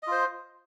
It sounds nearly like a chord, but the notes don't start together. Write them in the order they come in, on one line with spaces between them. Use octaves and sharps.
D#5 F4 C5